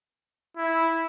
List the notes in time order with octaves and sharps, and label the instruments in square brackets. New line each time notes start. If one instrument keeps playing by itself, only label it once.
[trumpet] E4